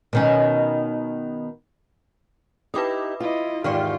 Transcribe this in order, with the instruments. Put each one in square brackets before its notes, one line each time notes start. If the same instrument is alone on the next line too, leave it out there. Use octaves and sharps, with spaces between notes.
[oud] B2 D#3 C#4
[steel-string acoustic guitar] D#4 E4 G4 [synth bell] B4 D6 D#6
[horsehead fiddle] E4 D#5 [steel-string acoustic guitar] F4
[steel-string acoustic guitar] E2 G#2 D#3 [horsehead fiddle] F4 G4 [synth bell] D5 C#6 F6